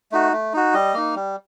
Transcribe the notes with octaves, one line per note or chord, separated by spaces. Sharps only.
A3 D#4 F#4
A3
D#4 F#4
G3 D#5
A#3 D#4
G3